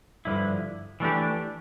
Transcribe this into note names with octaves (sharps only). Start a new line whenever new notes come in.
G2 D3 F3 E4
E3 A3 D4 G4